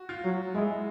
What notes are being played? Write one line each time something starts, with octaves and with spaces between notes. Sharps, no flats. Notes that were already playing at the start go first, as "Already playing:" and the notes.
Already playing: F#4
F4
F#3
G#3 E4